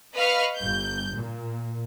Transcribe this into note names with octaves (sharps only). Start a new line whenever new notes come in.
B4 D#5 F5 B5 C#6 F6
G1 G6
A#2